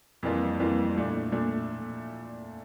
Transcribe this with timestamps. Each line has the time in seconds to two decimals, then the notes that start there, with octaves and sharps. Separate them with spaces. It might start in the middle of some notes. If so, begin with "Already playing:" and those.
0.23 F2 E3 G3 A#3 F4
0.60 F2 E3 G3 A#3 F4
0.95 A#2 A3 D4
1.32 A#2 A3 D4